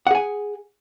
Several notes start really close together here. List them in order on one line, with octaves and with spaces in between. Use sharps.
F#5 G#4 G#5